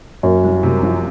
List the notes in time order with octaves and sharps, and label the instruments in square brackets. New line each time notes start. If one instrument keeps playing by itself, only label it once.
[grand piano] F#2 [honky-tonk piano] A#3
[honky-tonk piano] C2
C3
F3